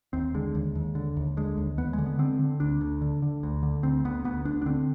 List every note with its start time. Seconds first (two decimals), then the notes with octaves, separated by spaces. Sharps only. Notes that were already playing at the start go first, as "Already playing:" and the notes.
0.13 D#2 C4
0.34 D3 G#3
0.55 D#2
0.75 D#2
0.95 D3
1.16 D#2
1.37 D3 G#3
1.57 D#2
1.77 D#2 B3
1.93 G#3
1.98 D3
2.06 B3
2.19 D3 C4
2.39 D3
2.60 D2 D4
2.81 D2
3.01 D3
3.22 D3
3.43 D2
3.63 D3
3.83 D2 C4
4.05 D2 B3
4.24 D2 B3
4.45 D2 D4
4.62 D4
4.66 D3 C4